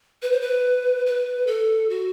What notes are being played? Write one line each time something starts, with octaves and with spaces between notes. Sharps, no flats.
B4
C5
B4
B4
A4
F#4